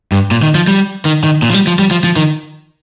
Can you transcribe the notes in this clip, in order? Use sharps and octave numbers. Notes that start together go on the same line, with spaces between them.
G2
A#2
D#3
F3
G3
D#3
D#3
A#2
F3
G3
F3
G3
F3
F3
D#3